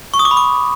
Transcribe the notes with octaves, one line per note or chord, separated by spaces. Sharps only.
C#6
D#6
D6
B5
D6